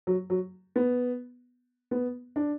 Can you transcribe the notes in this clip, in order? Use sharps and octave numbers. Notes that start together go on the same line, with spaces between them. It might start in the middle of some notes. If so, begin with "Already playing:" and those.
F#3
F#3
B3
B3
D4